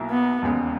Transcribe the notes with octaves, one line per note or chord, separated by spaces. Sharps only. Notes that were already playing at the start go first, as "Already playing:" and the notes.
Already playing: B1 B2 F#3 A#3 E4
B3
E1 D#2 C#3 G#3 B3